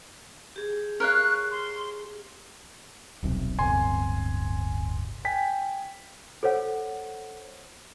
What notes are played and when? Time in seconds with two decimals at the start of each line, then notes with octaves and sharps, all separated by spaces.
0.56 G4 G#4
1.00 A#4 C#5 F5 F#6
1.51 C6
3.23 D#1 B1 C3
3.59 D1 G1 C3 G#5 C6
5.25 G5 G#5 B6
6.43 A4 C5 C#5 F#5